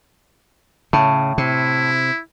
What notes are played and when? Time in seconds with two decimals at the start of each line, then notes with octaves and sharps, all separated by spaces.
0.93 A2 C#3
1.38 C3 E4